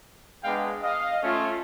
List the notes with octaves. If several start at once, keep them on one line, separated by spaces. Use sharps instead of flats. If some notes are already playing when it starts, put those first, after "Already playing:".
G#3 B3 D4 F5 G5
D#5 F5
A3 C#4 F4